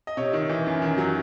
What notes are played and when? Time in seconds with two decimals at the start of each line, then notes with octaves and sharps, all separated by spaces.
0.07 D#5
0.17 C3 C#5
0.33 D#3
0.49 E3
0.66 F#2
0.82 D#3
0.98 F#3